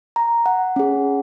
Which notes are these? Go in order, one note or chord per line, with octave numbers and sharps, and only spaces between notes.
A#5
F#5
C#4 G#4